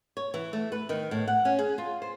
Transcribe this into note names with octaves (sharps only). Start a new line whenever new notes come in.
C#5
E3
A3
B4
D#3
A2
F#5
C#4
G#4
F4
C5